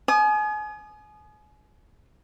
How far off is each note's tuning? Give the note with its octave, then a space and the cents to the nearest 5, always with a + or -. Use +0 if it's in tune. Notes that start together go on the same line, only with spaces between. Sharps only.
G#5 +35 D#6 -25